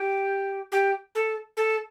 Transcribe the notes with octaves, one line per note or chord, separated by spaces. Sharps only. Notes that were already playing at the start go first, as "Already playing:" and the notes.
Already playing: G4
G4
A4
A4